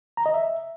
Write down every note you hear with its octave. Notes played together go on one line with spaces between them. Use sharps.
A#5
D#5
E5